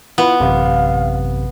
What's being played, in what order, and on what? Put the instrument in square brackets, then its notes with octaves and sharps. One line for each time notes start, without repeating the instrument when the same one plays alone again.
[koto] B3 [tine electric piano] E4 F4
[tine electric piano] A1 F#2 C3 [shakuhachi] F5